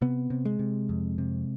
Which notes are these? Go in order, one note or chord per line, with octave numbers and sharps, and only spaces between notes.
C3 B3
C3
G#3
C3
F2
C3